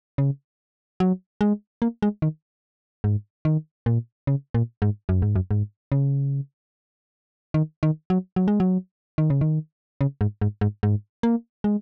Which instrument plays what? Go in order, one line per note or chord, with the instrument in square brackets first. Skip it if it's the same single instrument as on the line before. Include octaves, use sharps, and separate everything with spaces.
[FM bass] C#3
F#3
G#3
A#3
G#3
D#3
G#2
D#3
A#2
C#3
A#2
G#2
F#2
G#2
F#2
G#2
C#3
D#3
D#3
F#3
F#3
G#3
F#3
D#3
C#3
D#3
C#3
G#2
G#2
G#2
G#2
A#3
G#3